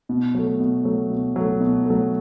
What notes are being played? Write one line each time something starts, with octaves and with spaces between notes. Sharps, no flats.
B2
F#3 A3
B2
F#3 A3
B2
F#3 A3
B2
F#3 A3